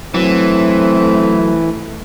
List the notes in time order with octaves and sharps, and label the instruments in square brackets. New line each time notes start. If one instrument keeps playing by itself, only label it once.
[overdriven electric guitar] E3 [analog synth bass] F#3 [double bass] A3 [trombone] C4